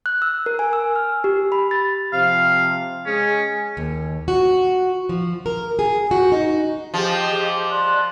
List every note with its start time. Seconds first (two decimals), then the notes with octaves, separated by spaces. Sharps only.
0.06 F#6
0.22 E6
0.46 A#4
0.59 G#5
0.73 E6
0.96 F6
1.24 G4
1.52 B5
1.71 A6
2.13 C3 F3 F5
3.06 G#3 C#4 G#4
3.77 D#2
4.28 F#4
5.09 F3
5.46 A#4
5.79 G#4
6.11 F#4
6.32 D#4
6.94 F3 G4 G#4 D#5
7.48 D6
7.71 D5 C6 F#6